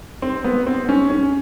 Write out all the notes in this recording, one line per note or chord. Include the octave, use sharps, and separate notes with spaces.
C4
B3
C4
C#4
C#4